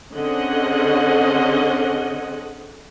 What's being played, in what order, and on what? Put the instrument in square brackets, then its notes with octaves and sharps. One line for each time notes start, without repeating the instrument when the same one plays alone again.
[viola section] D3 C4 C#4 G#4 D#5 F#5